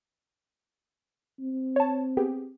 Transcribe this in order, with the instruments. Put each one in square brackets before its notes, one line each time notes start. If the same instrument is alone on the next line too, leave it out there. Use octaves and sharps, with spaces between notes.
[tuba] C4
[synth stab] C#5 A5
B3 G4 G#4